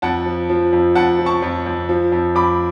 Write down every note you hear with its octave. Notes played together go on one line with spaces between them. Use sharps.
F2 F#5 A5
F3
F3
F2
F2 F#5 A5
F3
A5 C#6
F2
F2
F3
F2
F2 B5 D6